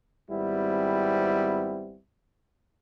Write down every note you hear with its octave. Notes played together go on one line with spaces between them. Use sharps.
G#1 G3 B3 C4 E4